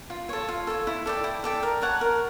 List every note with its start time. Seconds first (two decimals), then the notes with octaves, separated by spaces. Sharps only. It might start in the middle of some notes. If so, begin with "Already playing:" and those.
0.10 F4
0.29 A4 C#5
0.49 F4
0.67 A4 C#5
0.87 E4
1.06 A4 D5 G5
1.24 E4
1.44 A4 D5 G5
1.63 A#4
1.81 C#5 F#5 A5
2.01 A#4